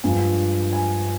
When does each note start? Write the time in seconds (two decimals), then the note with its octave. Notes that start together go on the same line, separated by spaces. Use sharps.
0.04 G2 F3 G#3 G#5
0.73 G#5